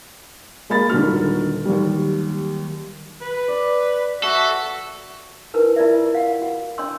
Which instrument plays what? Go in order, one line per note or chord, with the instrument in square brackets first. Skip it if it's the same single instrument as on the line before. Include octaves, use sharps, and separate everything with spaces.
[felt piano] G#3 A#3 B5 A6
D#1 D3 D#4 F#4 F6
D#2 F#3 G3
[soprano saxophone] B4
[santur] D5
[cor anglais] F#4 [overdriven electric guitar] A4 [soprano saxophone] E5
[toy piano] D#4 E4 A#4 B4 G#5
E4 F4 A#4 D5 E5
F5 F#5
F#4
D4 C#5 D#5 G5 C6 E6